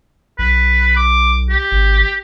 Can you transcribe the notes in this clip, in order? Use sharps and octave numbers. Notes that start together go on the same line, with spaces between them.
B1 B4
D6
G4
G#1